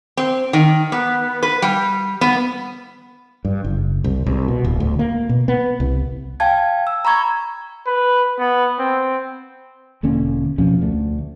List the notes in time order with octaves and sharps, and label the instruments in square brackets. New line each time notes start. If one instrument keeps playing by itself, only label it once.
[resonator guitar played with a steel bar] C4
D#3
B3
B4
G3
B3
[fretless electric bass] G2
F#1
C2
C2
B2
D1
D2
A#3
B2
B3
C2
[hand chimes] F5 G5 A5 G#6
E6
A#5 B5 C#6 G#6
[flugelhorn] B4
B3
C4
[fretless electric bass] E1 D3 A#3 C#4
F2 B2 F3 C#4
D2 A3